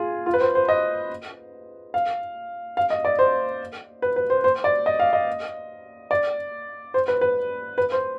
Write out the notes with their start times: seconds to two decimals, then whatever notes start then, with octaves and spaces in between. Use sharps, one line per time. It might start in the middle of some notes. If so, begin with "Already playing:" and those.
Already playing: F4 G#4
0.26 F4
0.34 B4
0.41 C5
0.55 C5
0.69 D#5
1.94 F5
2.77 F5
2.90 D#5
3.05 D5
3.19 C5
4.02 B4
4.16 B4
4.30 C5
4.44 C5
4.64 D5
4.86 D#5
5.00 F5
5.13 D#5
6.11 D5
6.94 C5
7.08 B4
7.21 B4
7.78 B4
7.92 C5